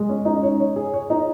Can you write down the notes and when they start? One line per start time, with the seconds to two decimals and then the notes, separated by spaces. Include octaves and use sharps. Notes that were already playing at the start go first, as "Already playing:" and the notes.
Already playing: G#3
0.09 C#4
0.25 D#4
0.43 C#5
0.60 C#5
0.76 G#4
0.94 C#5
1.10 D#4